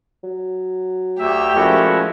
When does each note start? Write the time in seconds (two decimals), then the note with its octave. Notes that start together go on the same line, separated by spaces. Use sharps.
0.23 F#3
1.19 D2 G4 E5
1.55 A#2 F3 G#3 A3 C#4 E4 F#4